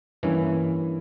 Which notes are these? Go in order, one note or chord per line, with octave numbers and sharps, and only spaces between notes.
G2 E3 A#3 C#4 E4